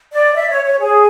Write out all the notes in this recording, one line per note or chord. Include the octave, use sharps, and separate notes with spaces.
D5
E5
C#5
C#5
G#4